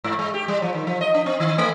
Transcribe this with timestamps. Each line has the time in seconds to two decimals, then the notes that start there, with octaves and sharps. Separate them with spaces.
0.04 G#2
0.19 G#3
0.34 G4
0.48 G3
0.62 F3
0.74 D#3
0.87 F3
1.01 D#5
1.14 D4
1.26 C4
1.40 D#3
1.58 A3